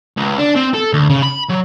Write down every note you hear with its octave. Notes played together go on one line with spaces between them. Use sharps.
C#2
D4
C4
A4
D2
C#3
B5
F#3